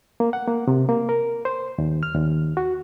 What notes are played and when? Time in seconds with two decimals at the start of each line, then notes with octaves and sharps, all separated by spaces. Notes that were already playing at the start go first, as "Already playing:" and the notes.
0.20 A#3
0.33 F#5
0.48 A#3
0.68 C3
0.89 A#3
1.09 A#4
1.45 C5
1.78 D#2
2.03 F6
2.14 D#2
2.57 F#4